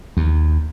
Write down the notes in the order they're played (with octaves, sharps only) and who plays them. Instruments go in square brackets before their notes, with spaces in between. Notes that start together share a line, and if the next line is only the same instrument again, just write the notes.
[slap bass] D#2